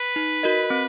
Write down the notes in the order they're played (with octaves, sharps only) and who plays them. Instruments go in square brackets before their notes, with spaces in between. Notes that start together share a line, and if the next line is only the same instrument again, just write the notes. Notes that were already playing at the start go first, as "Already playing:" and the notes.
Already playing: [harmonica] B4
[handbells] D#4
F#4 A#4 D#5
C4